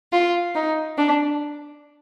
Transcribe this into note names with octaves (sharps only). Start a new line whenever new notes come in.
F4
D#4
D4